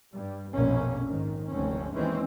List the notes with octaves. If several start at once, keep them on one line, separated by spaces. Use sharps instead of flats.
G2 G3
A#1 F2 B2 A#3 C#4
G#2 D#3
F1 D2 G#2 C4 C#4
D#2 E3 G#3 C4 C#4